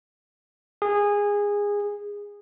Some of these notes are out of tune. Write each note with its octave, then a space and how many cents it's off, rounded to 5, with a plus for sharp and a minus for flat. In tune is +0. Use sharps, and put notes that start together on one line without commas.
G#4 -20